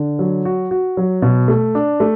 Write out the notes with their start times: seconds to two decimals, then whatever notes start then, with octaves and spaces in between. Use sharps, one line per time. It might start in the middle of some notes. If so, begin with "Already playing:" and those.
Already playing: D3
0.19 F#3
0.45 F#4
0.71 F#4
0.97 F#3
1.22 B2
1.48 A3
1.75 D4
2.00 A3